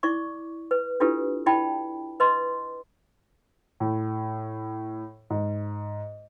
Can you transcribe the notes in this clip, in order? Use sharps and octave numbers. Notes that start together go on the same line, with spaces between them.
E4 D5 C#6 D6
B4
D4 E4 F4 G4 A4 B4
E4 D5 G5 A5 B5
B4 D#5 C6
A2
G#2